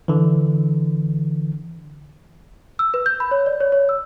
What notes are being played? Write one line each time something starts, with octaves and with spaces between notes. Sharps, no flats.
D3 E3
E6
B4
G6
B5
C#5
D5
C#5
C#5
E6